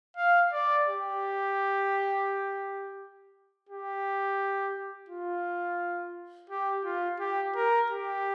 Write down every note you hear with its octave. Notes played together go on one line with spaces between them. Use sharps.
F5
D5
G4
G4
F4
G4
F4
G4
A#4
G4